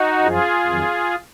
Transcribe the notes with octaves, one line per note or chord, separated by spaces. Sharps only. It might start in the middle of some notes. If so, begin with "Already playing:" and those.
Already playing: D#4 F#4
F#2 F3 F4 G#4
F2 D#3 F#3